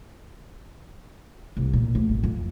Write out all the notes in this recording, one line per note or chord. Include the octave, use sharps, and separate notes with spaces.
C2
A#2
D2
G#1
F2